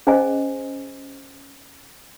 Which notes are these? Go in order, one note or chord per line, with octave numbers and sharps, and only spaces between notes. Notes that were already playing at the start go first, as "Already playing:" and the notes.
C#4 G#4 C5 D#5 G#5